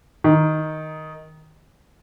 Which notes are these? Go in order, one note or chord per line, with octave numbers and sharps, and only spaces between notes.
D#3